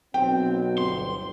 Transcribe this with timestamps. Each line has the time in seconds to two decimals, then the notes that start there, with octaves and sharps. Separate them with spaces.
0.14 B1 C4 G5
0.78 G1 D2 C6